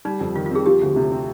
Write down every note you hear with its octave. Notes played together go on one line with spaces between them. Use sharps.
G3 D#4
F2
D#3 F4
F4
C4 G#4
F3 G4
D2
C3
C4